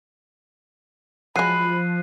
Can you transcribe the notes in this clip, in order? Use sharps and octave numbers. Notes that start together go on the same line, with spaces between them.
F3 F#3 G#3 B5 F#6 C7 D#7